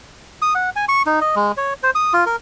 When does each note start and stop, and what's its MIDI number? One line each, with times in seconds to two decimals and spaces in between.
0.42 0.54 87
0.55 0.70 78
0.76 0.85 80
0.89 1.02 85
1.06 1.20 63
1.21 1.35 75
1.36 1.52 56
1.57 1.74 73
1.83 1.90 72
1.95 2.13 87
2.13 2.25 65
2.26 2.36 70